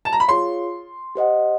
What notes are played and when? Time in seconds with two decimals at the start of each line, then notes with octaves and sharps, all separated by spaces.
0.05 A5
0.13 A#5
0.20 B5
0.28 F4 G#4 C#5 F5 C6
1.15 G4 C5 D#5 F#5